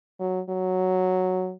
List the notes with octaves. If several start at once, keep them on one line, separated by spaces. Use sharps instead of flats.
F#3
F#3